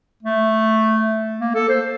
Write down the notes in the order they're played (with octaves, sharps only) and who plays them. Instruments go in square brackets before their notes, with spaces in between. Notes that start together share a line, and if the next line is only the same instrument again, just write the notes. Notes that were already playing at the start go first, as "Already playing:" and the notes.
[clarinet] A3
A#3
A4
C5